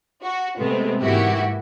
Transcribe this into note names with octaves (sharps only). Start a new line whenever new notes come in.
F#4
C3 G#3 A3 B3 C4
G#2 E3 A#3 E4 F#4 G4